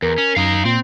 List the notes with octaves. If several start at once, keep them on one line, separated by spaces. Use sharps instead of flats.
E2 A#4
C#4
F#2 D#4 F5
A#2 C4